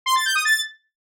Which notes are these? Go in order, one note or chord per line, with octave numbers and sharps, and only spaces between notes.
C6
A6
G6
D#6
A6